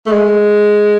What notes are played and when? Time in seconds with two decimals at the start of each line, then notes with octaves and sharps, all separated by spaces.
0.06 A3
0.12 G#3